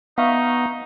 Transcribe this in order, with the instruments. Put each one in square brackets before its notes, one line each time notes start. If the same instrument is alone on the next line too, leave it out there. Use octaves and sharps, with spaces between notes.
[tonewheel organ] B3 [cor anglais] D#4 [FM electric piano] E5 F5 C#6